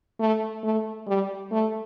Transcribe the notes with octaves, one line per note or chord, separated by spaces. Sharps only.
A3
A3
G3
A3